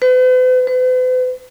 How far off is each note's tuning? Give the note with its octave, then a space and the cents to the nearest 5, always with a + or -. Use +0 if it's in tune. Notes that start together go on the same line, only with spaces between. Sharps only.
B4 +45
B4 +45